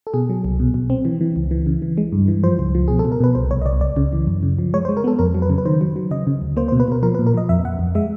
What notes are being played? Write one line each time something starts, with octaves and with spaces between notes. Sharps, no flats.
A4
B2 G#4
F#3
C2
B2
B2
C4
E3
E3
C#2
E3
C#3
E3
G#3
G2
E3
F3 C5
C#2
F3
B2 G#4
A4
B2
A#4
B2 B4
C2 C5
C2 C#5
D#5
C2 D5
C#2 D5
C#3
E3
F#2
C#3
F3
G#3 C#5
C5
G#3
A#4
B3 A4
F2 A#4
F#3
B4
C#3
B4
D#3 C5
F#3
F#3
C#3 D#5
C#3
D2
A#3 C5
C5
B2
B4
B2 A#4
F3 A#4
B4
A#2
A#4
F3 D#5
F2 E5
F2 F#5
F2
G#3 E5